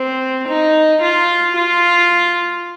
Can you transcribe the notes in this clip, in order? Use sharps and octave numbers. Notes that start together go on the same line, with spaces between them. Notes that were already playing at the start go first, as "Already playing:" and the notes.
Already playing: C4
D#4
F4
F4